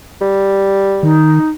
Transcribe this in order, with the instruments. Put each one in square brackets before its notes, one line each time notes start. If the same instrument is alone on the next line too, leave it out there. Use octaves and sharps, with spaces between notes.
[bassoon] G3
[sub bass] D#3 [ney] D#4